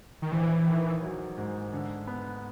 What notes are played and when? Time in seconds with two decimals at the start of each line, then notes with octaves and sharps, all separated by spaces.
0.22 D#3
0.31 A#1 E3
0.67 D#3
1.02 F#3
1.38 G#2
1.73 D3
2.07 B3